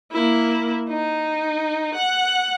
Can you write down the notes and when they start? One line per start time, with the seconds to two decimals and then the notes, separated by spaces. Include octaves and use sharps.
0.11 A#3 E4
0.88 D#4
1.94 F#5